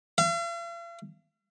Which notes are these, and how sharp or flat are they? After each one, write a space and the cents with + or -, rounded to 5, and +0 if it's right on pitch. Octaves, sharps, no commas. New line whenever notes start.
F5 -45